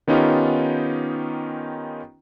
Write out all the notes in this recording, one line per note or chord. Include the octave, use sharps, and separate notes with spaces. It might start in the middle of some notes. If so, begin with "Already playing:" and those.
D#3 B3 C#4 D#4 F4 G4